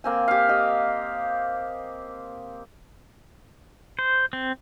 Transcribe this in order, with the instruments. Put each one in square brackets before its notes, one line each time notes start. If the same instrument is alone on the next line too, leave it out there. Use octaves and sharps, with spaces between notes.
[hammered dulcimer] A#3 C4 G#5
G4 F5
G4 D#5
[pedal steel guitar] C5
C4